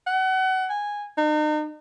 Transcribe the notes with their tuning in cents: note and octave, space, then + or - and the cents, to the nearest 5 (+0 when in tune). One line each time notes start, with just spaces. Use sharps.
F#5 +30
G#5 -10
D#4 -40